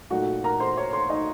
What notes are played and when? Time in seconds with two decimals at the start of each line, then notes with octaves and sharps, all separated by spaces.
0.10 A#2 F#3 A3 D#4 F#4 F#5
0.44 A#4 A#5
0.60 C5 C6
0.77 C#5 C#6
0.93 C5 C6
1.09 D#4 D#5